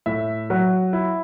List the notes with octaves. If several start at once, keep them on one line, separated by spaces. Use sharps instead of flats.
A2 E5
F#3
E4